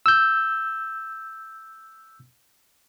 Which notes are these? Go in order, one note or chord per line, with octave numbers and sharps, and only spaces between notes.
E6 G6